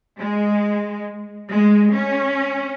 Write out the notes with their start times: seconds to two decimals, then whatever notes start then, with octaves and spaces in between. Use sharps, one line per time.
0.19 G#3
1.51 G#3
1.94 C#4